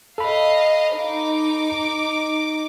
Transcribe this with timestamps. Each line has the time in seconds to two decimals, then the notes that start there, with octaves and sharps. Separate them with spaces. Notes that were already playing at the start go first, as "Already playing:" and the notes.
0.18 A4 D#5 F5 B5
0.96 D#4 D6